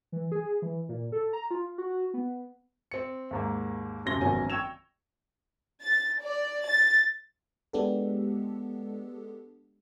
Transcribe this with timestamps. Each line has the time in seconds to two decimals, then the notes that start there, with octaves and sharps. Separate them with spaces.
0.12 E3
0.32 G#4
0.62 E3
0.89 A#2
1.12 A4
1.33 A#5
1.51 F4
1.78 F#4
2.14 B3
2.91 C4 C#7
3.31 D#2 G#2 A#3
4.05 D#1 F#2 C3 C6 A#6 G7
4.21 G#1 E2 D#3 F#3 C#4 G#5
4.50 G5 C#6 E6 G#6 E7 F7
5.82 A6
6.20 D5
6.65 A6
7.73 G#3 B3 D4 G4 A4